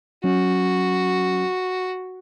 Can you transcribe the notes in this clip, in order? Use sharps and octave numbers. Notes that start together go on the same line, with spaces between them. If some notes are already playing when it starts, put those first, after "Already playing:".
F#3 C#4 F#4